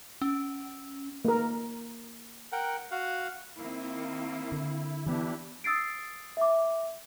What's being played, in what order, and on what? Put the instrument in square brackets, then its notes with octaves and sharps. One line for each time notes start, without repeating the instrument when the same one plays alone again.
[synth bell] C#4
[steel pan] A#3 A#4
[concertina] A#4 F#5 G5
F#4 F5 F#5
[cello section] D#3 A#3 C4 [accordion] E4
[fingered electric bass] D3
[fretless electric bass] E3 B3 [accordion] D4 E4 G4
[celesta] D#6 E6 A6 C7 D7
E5 D6